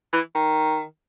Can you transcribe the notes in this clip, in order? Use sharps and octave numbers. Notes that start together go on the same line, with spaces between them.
E3
D#3